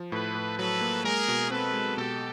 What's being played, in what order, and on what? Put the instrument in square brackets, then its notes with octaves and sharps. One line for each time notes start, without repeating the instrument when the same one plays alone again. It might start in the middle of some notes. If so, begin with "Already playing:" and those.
Already playing: [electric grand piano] F3
[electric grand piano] A2 [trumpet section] A4 B4
[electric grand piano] A2
[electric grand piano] F#3 [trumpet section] A4 B4
[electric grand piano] A#3
[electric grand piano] G#3 [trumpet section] G#4 A#4
[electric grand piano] B2
[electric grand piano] C4 [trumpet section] A4 B4
[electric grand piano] G#3
[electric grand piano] B2 [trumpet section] G4 A4